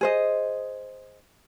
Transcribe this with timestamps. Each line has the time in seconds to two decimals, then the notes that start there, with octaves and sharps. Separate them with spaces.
0.01 G#4 C5 D#5